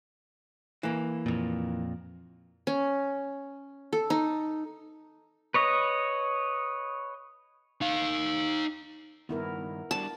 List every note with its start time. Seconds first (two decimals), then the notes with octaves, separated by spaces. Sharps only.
0.83 E3 A#3
1.26 F2 A#2
2.67 C#4
3.93 A4
4.10 D#4
5.54 B4 C#5 D#5
7.81 D#4 F5
9.29 G2 D#3 B3 E4 A#4
9.91 G3 D4 F#4 A5